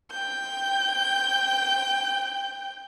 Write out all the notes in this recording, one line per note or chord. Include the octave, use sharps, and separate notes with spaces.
G5 G6